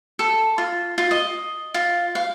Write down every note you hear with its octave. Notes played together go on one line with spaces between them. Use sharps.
A4
F4
F4
D#5
F4
F5